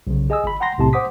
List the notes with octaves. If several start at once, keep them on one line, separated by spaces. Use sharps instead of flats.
B1 C#3
G#4 D#5 G#5 D#6 E6
G1 B5
F#5 G5 A#5 C6 A#6
B1 A2 C3 A5 C6
C5 F#5 D6 D#6 B6